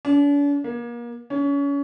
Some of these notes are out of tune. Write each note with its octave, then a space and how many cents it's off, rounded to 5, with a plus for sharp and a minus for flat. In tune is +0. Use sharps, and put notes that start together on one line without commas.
D4 -45
A#3 +35
C#4 +30